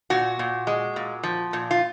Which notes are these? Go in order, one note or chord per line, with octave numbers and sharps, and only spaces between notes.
A#2 F#4
A#2
G#3
A#2
F3
A#2
F4